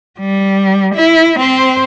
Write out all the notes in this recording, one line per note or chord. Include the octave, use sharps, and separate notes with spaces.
G3
E4
C4 C5